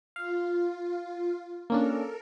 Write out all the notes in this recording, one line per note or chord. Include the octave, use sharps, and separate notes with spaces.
F4 F5
A#3 C#4 D4 A4 A#4